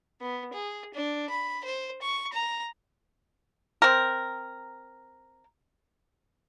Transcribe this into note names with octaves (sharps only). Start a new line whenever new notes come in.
B3
G#4
D4
B5
C5
C#6
A#5
C4 A#4